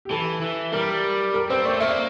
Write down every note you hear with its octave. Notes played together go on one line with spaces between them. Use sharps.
G4
E3 A4
E3
G3 A#4
A#4
C4 C5
A3 D5
A#3 E5